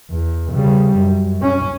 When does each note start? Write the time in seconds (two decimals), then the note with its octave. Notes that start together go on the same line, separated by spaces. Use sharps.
0.11 E2
0.53 C#3 G3
0.96 F#2
1.42 C#4